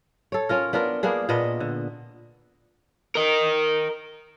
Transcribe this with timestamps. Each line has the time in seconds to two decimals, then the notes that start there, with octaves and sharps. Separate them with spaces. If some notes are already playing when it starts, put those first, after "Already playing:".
0.32 A4 C#5
0.49 C#4 F4 A#4
0.73 B3 D4 F4 A#4
1.03 A#3 B3 D4 G#4
1.29 A#2 B3 D4 D#5
1.60 D3
3.15 A#4 D#5